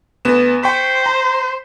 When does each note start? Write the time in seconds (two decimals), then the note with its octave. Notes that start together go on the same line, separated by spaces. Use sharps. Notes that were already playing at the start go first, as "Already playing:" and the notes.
0.25 D2 B3 E7
0.63 C5 G5 C#6 B6
1.06 A#5